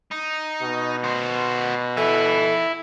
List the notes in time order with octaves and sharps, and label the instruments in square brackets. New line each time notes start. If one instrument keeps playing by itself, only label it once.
[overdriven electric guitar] D#4
[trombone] B2
[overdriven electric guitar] F#4 C5
[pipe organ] E4 [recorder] A4 [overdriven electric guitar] E5 G#5